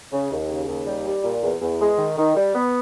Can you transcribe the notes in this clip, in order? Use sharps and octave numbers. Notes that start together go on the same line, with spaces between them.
C#3
D#2
C#3
D#2
G3
G3
A#2
E2
E2
G#3
D#3
D#3
G3
B3